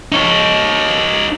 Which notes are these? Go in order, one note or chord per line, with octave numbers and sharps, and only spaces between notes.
D#4 C#5